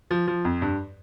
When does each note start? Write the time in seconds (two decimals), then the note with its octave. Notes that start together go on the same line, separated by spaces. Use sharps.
0.11 F3
0.27 F3
0.45 F2
0.62 G2